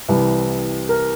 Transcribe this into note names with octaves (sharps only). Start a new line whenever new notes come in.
C2 C3 E3
A#4